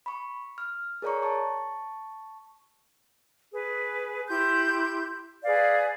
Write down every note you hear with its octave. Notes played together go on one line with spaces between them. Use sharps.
B5 C#6
F6
G#4 A#4 C#5 D5 A#5 C#6
A5 C#6
G#4 B4
E4 G4 C6 G6
G#4 B4 D5 F5